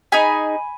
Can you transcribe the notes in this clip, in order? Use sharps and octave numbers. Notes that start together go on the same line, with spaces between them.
D#4 G#4 G#5 B5